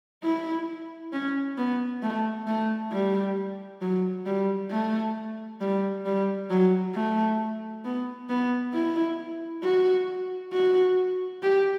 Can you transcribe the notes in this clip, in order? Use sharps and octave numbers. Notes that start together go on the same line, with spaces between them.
E4
C#4
B3
A3
A3
G3
F#3
G3
A3
G3
G3
F#3
A3
B3
B3
E4
F#4
F#4
G4